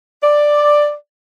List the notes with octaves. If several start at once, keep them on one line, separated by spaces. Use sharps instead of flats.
D5